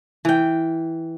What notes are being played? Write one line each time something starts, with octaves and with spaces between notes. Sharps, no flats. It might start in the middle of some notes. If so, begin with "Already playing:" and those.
E3 G5